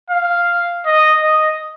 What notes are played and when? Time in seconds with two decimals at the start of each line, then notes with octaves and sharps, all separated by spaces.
0.10 F5
0.85 D#5
1.23 D#5